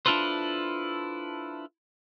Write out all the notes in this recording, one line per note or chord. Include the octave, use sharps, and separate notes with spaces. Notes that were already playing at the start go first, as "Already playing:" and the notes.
D4 E4 F4 A4 B4 C5